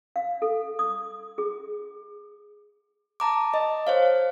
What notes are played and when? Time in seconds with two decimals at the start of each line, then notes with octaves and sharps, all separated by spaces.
0.16 F5
0.42 A4
0.79 D#6
1.38 G#4
3.20 A5 A#5 D6
3.54 D#5
3.87 C5 C#5 F5